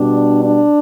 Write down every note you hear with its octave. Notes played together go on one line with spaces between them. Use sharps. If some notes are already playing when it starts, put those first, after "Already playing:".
Already playing: B2 G3 D4
D4